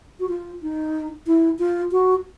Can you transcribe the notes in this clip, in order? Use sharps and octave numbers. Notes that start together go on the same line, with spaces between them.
F#4
F4
D#4
E4
F4
F#4